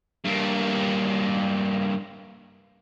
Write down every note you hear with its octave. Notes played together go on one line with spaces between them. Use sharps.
G2 A#3